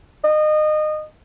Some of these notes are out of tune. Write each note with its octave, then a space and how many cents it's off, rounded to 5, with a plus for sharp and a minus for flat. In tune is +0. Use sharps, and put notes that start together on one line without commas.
D#5 -25